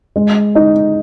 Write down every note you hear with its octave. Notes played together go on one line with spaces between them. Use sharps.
G#3
D#4